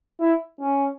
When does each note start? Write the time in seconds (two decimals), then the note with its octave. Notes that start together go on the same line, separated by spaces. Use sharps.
0.20 E4
0.60 C#4